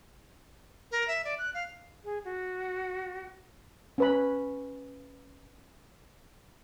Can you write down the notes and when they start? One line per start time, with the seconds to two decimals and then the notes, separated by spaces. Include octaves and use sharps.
0.91 A#4
1.08 E5
1.25 D5
1.38 F#6
1.54 F5
2.05 G#4
2.25 F#4
3.98 C#4 B4 B5